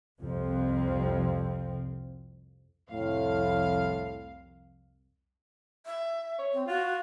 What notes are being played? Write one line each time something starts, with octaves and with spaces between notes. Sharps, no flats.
C2 F2 F3 C4
C2 F2 A2 F5
E5
C#5
C4
F4 F#4